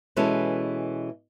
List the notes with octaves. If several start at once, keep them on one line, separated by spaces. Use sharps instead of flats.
B2 E3 G#3 C#4 A4